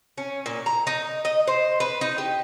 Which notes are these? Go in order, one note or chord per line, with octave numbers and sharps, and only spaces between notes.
C#4
A#2
A#5
D#4
D#5
C5
B4
D#4
G4